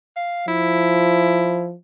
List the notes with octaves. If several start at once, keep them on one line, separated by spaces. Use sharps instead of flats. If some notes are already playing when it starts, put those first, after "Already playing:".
F5
F3 E4